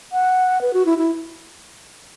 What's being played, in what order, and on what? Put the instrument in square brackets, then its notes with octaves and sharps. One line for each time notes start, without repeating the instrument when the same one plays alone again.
[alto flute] F#5
B4
F#4
E4
E4